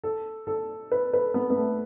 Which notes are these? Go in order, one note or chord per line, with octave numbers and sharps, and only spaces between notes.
A4
A4
B4
B4
B3
B3
A3